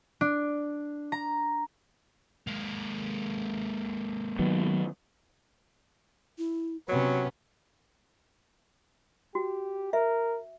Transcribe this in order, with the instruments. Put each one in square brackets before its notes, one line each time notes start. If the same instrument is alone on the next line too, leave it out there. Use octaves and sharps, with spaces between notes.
[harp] D4
A#5
[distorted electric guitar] G#3 A#3
[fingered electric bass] D#3 F#3 B3
[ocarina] E4
[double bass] C3 [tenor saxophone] F#3 [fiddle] B3 C#4 [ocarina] C#5
[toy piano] F#4 [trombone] G4
[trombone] A#4 [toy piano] E5